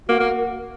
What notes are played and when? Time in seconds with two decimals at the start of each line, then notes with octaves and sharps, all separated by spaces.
0.09 A#3 F#4
0.20 A#3